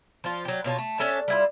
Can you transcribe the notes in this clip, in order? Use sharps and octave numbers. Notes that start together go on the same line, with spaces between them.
F3 F4
F#3 G4
B2 F4 C#5 A5
A3
C#4 D4 A4 E5
G3 E4 F4